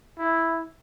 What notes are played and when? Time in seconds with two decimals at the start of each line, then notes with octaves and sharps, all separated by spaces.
0.19 E4